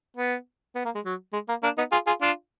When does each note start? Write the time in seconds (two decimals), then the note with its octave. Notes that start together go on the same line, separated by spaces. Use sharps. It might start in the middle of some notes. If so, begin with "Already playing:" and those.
0.17 B3
0.75 B3
0.85 A#3
0.95 G#3
1.05 F#3
1.33 G#3
1.49 A#3
1.63 A#3 D4
1.77 B3 D#4
1.92 F4 G#4
2.07 F4 G#4
2.21 D4 F4